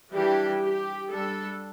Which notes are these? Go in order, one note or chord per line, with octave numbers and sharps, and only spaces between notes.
E3 G3 D4 G4
G4
G3 D4 A4